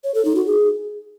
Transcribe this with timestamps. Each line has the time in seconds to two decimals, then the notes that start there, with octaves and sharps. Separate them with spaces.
0.04 C#5
0.14 A4
0.25 D#4
0.36 F#4
0.46 G#4